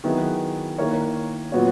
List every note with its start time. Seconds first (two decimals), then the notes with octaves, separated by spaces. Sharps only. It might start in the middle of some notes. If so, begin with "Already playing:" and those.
0.04 D#3 F#3 B3 E4 G#4
0.78 D#3 A#3 E4 A#4 C#5
1.52 A#2 F#3 B3 F#4 C#5